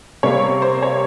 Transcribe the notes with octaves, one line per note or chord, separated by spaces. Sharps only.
C3 G3 A#3 C#5
C5
C#5